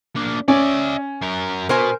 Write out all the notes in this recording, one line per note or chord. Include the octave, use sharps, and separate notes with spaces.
A#3 D4
C#4 D5 E5
F#2 A#4
B2 A#4 C5 G#5